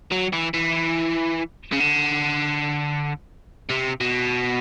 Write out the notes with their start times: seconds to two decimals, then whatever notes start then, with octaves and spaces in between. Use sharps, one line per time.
0.11 F#3
0.33 E3
0.54 E3
1.72 C#3
1.80 D3
3.69 C3
4.00 B2